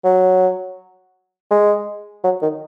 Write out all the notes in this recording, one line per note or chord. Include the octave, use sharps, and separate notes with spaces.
F#3
G#3
F#3
D#3